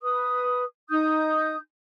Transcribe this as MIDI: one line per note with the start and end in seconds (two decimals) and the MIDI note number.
0.01 0.64 71
0.01 0.64 87
0.90 1.57 63
0.90 1.57 87
0.90 1.57 91